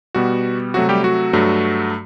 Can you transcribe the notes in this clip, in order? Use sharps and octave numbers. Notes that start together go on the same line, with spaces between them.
B2 G3 B3 F#4
C3 F#3 A3 F#4
G3 G4
F#4
G2 F#3 A3